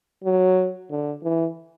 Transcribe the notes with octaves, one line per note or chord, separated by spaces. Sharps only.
F#3
D3
E3